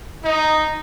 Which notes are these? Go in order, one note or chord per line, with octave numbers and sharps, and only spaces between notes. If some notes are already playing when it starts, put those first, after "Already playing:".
D#4